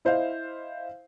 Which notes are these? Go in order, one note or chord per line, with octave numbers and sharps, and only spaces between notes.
E4 C5 D#5 F5